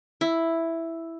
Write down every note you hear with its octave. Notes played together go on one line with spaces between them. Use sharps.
E4